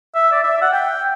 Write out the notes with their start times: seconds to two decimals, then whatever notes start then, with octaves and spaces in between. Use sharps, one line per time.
0.15 E5
0.32 D5
0.44 E5
0.62 F#5
0.73 G5